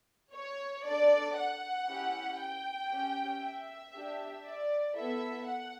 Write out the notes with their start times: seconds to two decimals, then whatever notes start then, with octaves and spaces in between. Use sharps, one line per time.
0.34 C#5
0.85 D4 A4 D5
1.37 F#5
1.88 C#4 E4 G4
2.41 G5
2.92 C#4 G4
3.43 E5
3.94 D4 G4
4.45 D5
4.97 B3 E4 A4 E5
5.48 F#5